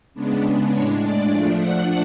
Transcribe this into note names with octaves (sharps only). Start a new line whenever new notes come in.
C#3 G#3 B3 D4
A2 G#3 D4 C#5
D5
F3 A3 D4 D5
F#5